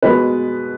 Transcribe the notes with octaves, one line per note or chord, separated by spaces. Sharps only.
B2 G#3 B4